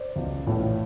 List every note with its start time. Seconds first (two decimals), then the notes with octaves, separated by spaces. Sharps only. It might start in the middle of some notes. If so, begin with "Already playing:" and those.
Already playing: C5 D5
0.16 C#2 B2
0.46 A#1 A2 E3